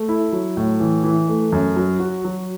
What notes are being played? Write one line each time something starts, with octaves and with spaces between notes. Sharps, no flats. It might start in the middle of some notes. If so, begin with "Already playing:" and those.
Already playing: A3
E4
F#3
A2
E3
E3
A3
F#2
F#3
F#4
F#3